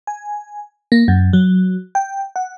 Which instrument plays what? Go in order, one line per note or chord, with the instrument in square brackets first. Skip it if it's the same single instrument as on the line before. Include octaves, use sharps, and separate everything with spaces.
[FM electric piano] G#5
A#3
F#2
F#3
G5
F#5